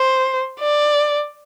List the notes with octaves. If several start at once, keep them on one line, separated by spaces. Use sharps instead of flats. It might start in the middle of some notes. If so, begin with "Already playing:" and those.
Already playing: C5
D5